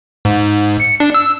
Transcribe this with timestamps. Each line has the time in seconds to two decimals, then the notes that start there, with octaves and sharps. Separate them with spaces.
0.25 G#2
0.80 C#7
1.00 D4
1.15 E6